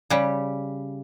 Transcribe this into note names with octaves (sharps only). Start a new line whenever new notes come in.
C#3 G3